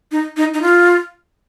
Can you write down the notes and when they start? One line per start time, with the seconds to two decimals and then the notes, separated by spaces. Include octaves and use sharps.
0.12 D#4
0.37 D#4
0.54 D#4
0.62 F4